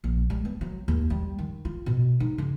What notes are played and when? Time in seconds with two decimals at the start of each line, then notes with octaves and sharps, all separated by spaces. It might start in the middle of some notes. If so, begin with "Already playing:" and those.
0.04 A#1
0.30 G3
0.45 B3
0.61 F#3
0.88 D#2
1.10 G3
1.39 D#3
1.65 F4
1.86 B2
2.20 D#4
2.38 C#3